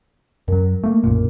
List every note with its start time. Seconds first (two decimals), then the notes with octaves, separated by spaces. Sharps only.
0.48 F#2 F#3 A#4
0.83 A3 A#3
1.04 B1 F#2 A#2